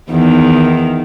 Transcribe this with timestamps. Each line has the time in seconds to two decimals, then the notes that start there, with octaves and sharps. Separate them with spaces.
0.11 E2 D#3